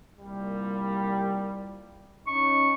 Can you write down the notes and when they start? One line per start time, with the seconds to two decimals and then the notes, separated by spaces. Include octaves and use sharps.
0.18 C2 A#2 G3
2.27 C#4 D#4 C#6